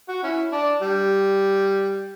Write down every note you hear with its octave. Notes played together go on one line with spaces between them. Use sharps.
F#4
C#4 E4
D4
G3